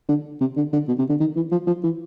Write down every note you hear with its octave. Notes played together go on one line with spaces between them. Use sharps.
D3
C3
D3
D3
B2
C3
D3
D#3
E3
F3
F3
E3